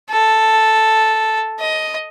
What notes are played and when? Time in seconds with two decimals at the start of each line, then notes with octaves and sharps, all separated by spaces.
0.11 A4
1.60 D#5